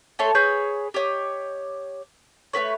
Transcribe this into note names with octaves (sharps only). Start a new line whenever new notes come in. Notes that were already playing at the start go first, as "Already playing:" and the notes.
A3 A4 C#5 C6
G#4 B4 C#5 G6
G4 C#5 D#5
A3 E4 B4 C#5